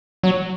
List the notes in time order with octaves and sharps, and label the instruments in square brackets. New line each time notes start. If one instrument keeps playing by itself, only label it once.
[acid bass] F#3